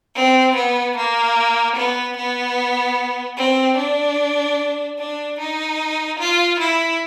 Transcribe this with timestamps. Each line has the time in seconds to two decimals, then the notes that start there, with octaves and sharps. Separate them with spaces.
0.15 C4
0.56 B3
0.96 A#3
1.76 B3
2.17 B3
3.37 C4
3.77 D4
4.99 D4
5.39 D#4
6.19 F4
6.59 E4